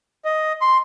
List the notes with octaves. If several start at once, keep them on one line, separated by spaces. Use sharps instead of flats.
D#5
C6